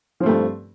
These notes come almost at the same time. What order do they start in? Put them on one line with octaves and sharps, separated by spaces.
F3 C4 A3 G2